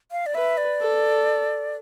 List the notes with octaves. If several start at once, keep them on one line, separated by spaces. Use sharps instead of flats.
F5
D5
B4 E5
D5
A4